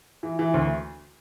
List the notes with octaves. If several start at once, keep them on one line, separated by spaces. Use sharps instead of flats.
E3
E3
D2